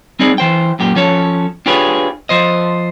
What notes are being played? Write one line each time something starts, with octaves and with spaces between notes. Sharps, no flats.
G3 C4 D#4 G#4 D5
E3 C5 G5
F#2 A#2 G4
F3 C#4 A4 C#5
D4 F4 G4 G#4 B4 C#5
F3 C5 D#5